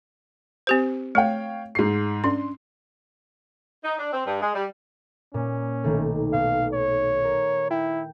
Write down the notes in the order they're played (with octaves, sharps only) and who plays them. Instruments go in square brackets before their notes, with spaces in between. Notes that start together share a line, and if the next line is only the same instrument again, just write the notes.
[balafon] C4 G4 C5
[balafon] A3 [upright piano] C#5 F5 G5
[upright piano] G#2 C7
[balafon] C#4 [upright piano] D4 C6
[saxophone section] D#4
D4
C4
G2
G#3
G3
[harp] A#2 [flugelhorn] C#4
[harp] B1 D#3 A3
[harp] B2 [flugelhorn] F5
[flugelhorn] C#5
[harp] A#4
[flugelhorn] E4 [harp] G5